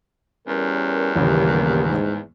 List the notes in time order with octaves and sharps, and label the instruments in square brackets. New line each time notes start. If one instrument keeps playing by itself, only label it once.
[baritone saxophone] E2 [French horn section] G3 C#4 A#4
[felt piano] D#1 A1 C#3 [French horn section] G2 A#3 G4
[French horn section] G#2